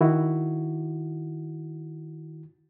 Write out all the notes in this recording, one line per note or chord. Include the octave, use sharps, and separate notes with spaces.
D#3 E4 F#4